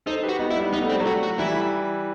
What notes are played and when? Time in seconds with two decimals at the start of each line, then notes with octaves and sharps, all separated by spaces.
0.06 D#4 A4 C5
0.23 G4 B4
0.29 F#4
0.39 B3 D#4
0.50 E4
0.56 G3 B3
0.73 B3 D#4
0.81 A3
0.90 G3 C4
1.00 F#3 A3
1.07 F#4
1.23 F#4
1.39 E3 G3 E4